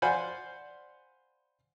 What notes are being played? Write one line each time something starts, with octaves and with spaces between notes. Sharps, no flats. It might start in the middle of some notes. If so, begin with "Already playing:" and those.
C5 D5 F5 F#5 G#5 B5